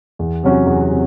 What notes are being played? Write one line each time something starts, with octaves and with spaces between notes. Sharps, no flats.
E2
C3 F#3 C#4 F#4
E2
C3